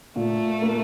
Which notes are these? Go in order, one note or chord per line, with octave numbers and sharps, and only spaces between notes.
A#2 A3
A#3